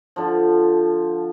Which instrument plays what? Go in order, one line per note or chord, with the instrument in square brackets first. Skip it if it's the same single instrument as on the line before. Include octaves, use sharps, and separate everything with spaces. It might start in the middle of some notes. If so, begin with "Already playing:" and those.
[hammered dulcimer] D3 F3